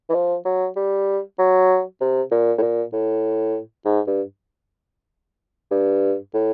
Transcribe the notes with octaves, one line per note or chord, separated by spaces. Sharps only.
E3
F3
F#3
G3
F#3
C3
A#2
A2
A#2
A2
G#2
G2
G2
A2